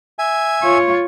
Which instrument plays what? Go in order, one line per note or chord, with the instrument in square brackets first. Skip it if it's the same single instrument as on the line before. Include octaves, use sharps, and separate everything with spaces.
[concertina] E5 G#5
[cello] F4 C#5